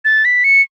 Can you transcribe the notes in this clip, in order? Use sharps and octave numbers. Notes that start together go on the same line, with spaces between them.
A6
B6
C#7